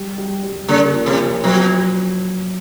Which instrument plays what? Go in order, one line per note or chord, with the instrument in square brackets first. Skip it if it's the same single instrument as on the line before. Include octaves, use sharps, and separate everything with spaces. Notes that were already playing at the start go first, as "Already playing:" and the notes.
Already playing: [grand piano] G3
G3
G3
[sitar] C#3 [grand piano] A#3
[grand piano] F3
[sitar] C3
[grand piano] F3
[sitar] B2 [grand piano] F#3